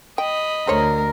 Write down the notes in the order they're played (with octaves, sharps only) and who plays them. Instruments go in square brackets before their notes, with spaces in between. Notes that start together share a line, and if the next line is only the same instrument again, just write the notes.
[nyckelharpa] D#5 B5 [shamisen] G5
[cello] D2 [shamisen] A3 C5 C#5 [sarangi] A#4